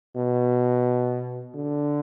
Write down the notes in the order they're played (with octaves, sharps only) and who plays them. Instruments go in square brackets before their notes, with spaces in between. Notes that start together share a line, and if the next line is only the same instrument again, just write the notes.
[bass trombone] B2
D3